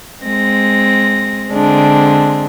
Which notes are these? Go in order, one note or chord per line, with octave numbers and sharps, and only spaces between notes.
G#3 C4 A#6
D3 G#3 C4 D4